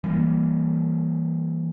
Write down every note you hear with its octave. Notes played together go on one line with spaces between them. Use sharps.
E3 G3 A3 A#3